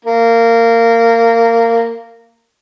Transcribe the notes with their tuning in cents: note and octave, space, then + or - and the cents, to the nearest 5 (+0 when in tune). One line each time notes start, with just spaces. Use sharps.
A#3 -20